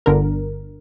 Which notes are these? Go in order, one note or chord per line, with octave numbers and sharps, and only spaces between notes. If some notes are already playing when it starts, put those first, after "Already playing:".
G1 D3 A#4